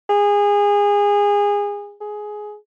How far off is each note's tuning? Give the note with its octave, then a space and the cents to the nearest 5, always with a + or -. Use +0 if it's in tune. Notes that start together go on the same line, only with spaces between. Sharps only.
G#4 -25
G#4 +15